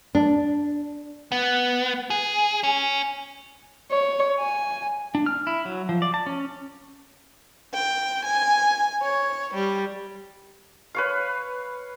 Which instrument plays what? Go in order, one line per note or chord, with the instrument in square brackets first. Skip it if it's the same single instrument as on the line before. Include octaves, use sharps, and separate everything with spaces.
[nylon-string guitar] D4
[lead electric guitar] B3
G#4
C#4
[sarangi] C#5
G#5
[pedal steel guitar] D4
F6
E4
F#3
F3
D5
A5
C#4
[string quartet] G5
G#5
C#5
G3
[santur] B4 C#5 F5